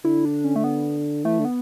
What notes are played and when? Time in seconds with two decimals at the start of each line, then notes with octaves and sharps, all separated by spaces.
0.04 D3 E4
0.25 D4
0.44 C#4
0.56 A3
0.64 B3
1.24 E3 A3
1.40 D3
1.45 B3